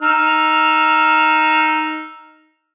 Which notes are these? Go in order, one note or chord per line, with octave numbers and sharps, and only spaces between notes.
D#4 E6 F6